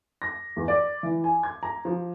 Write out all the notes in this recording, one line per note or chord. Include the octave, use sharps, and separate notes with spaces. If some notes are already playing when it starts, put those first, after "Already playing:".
A#6
E2
D5
E3
G#5
G#6
A#5
F3